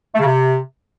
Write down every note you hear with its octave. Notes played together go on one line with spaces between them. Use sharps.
A3
C#3
C3